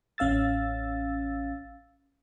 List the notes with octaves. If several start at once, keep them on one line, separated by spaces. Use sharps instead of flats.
A1 C#4 F5 E6 A6